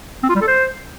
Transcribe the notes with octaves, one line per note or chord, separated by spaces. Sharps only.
C4
F4
G3
A4
C5